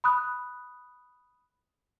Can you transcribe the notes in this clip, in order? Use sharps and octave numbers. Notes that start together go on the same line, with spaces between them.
B5 D#6 F#6